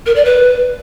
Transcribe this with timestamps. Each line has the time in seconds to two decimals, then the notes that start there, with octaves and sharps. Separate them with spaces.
0.06 A#4
0.16 D5
0.25 B4